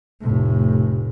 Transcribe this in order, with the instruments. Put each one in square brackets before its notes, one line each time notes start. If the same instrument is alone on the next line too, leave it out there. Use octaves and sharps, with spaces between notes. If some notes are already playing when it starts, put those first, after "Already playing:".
[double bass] F1 A2